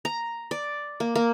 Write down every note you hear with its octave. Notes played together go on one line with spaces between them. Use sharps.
A#5
D5
A#3
A#3